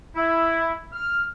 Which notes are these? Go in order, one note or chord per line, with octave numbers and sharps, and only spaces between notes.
E4
F6